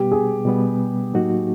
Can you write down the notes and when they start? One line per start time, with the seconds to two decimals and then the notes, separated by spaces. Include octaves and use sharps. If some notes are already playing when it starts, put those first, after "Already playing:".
Already playing: B2 G3 B3 G4
0.12 G#4
0.45 B2 G3 B3
1.13 A2 F#3 A#3 D#4 F#4